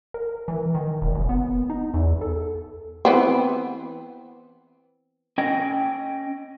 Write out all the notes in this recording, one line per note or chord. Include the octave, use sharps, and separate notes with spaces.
A#4
E3
D#3
E1
F#1
B3
D#4
E2
A4
E3 B3 C4
C#4 D#5 G5